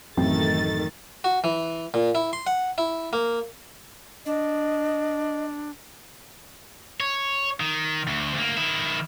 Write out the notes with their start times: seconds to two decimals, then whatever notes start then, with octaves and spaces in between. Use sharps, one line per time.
0.17 A1 F#2 D#3 A3 C4 A6
1.24 F#4
1.44 E3
1.94 A#2
2.15 E4
2.33 C6
2.47 F#5
2.78 E4
3.13 A#3
4.26 D4 D#5
7.00 C#5
7.60 D#3
8.07 D2
8.34 D2 A#3
8.57 D#3 E4